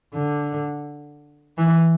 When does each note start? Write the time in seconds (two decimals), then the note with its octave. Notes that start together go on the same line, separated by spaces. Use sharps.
0.14 D3
1.58 E3